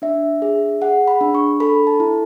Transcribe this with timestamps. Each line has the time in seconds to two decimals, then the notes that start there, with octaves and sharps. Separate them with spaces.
0.02 D4 E5
0.42 G#4
0.81 G#4 F#5
1.08 B5
1.21 D4
1.35 C#6
1.60 A4 B5
1.87 A5
2.00 E4